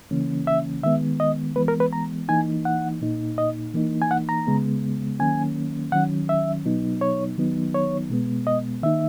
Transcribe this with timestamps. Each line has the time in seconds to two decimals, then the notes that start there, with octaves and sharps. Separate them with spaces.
0.11 C#3 E3 A#3 C#4
0.47 E5
0.83 D#3 G#3 B3 E5
1.20 D#5
1.56 E3 G#3 B3 B4
1.68 A#4
1.80 B4
1.93 A#5
2.29 E3 A#3 D#4 G#5
2.65 F#5
3.01 A#2 A#3 D#4
3.38 D#5
3.74 E3 A#3 D#4
4.02 G#5
4.11 F#5
4.29 A#5
4.47 C#3 G#3 B3
5.20 D#3 F#3 A#3 C#4 G#5
5.92 D#3 F#3 C#4 F#5
6.29 E5
6.65 B2 F#3 B3 D#4
7.01 C#5
7.37 D#3 F#3 B3 D#4
7.75 C#5
8.10 B2 G#3 B3
8.47 D#5
8.83 D#3 A#3 D#4 E5